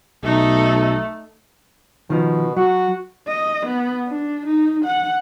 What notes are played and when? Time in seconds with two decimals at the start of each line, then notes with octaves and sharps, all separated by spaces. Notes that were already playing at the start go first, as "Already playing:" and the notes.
0.24 B1 A3 D#4 A4
2.10 B2 D#3 F3
2.57 F#3 F#4
3.28 D#5
3.66 B3
4.08 D4
4.46 D#4
4.85 F#5